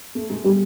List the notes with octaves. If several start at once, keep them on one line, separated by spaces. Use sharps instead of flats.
A3
G#3
G3